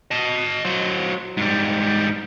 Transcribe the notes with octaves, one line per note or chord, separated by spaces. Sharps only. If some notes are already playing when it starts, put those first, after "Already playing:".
D#5 A5
F#3 C5
G#2 G3